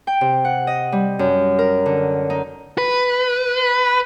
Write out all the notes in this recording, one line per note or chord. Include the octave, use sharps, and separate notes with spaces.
G5
C3
F#5
D#5
G3
F#2
A#4
D3
D#4
B4